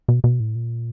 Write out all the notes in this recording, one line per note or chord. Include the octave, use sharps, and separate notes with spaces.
B2
B2
A2
A#2